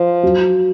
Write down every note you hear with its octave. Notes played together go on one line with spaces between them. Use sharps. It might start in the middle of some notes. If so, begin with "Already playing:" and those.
Already playing: F3
F#3